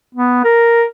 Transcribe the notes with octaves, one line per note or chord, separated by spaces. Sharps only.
B3
A#4